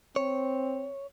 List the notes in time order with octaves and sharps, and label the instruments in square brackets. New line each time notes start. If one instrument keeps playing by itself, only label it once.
[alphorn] C4 [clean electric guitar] C#5